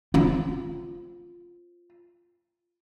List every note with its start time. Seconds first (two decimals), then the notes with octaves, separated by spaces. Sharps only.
0.14 C4 F4